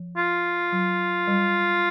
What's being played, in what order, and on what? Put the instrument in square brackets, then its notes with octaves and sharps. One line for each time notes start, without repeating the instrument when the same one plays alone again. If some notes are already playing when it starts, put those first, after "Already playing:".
Already playing: [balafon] F3
[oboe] F4
[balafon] F#3
G3